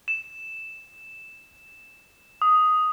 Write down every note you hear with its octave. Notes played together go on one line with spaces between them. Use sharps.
E7
D#6